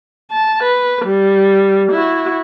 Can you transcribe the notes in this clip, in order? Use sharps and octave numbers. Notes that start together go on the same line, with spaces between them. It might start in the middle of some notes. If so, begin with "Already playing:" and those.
A5
B4
G3
E4 F#4